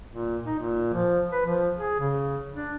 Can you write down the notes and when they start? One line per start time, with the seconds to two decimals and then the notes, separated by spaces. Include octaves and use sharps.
0.11 A#2
0.46 D#4
0.59 A#2
0.94 F3
1.32 B4
1.45 F3
1.78 G#4
2.00 C#3
2.54 D4